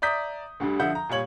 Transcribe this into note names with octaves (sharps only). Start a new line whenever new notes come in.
D5 E5 A#5 D#6 G6 B6
D2 D3 G3
D3 F3 E5 F#5 G6
A#5
A#2 G3 C#5 F#7